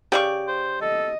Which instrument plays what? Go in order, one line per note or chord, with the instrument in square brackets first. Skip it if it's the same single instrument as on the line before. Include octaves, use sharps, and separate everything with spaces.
[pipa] C#3 D5 C#6 [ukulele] G4
[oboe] C5
[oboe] A4 [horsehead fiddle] D#5